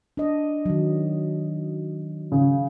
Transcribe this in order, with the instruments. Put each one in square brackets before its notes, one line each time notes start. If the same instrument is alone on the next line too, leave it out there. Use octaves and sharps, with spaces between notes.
[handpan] D4 D#5
D#3 F#3
[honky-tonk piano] C#3